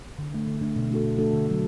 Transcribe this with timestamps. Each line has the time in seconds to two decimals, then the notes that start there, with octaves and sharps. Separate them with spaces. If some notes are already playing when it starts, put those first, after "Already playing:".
0.18 D3
0.33 A3 D4
0.47 D3
0.61 A3 D4
0.76 B2
0.91 A3 D4 F#4 A4
1.04 B2
1.18 A3 D4 F#4 A4
1.33 D3
1.47 F#3 A3